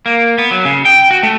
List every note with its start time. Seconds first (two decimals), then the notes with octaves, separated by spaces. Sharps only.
0.06 A#3
0.38 B3
0.51 F#3
0.65 C#3
0.85 G5
1.11 F#4
1.23 A3